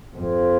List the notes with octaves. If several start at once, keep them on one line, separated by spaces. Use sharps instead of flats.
F2